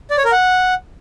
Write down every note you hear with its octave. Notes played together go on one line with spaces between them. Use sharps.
D5
C#5
A#4
F#5